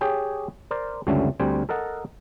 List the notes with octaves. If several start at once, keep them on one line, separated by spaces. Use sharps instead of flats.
G4 G#4 C#5 G5 G#5
A#4 C5 D5
C#2 F#2 D3 G3 A3 C#4
D2 G3 C4 G5 G#5
A4 A#4 D#5 F#5 A5